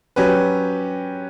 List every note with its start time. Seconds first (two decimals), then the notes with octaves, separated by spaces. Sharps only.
0.16 F#3 C#4 G4 B4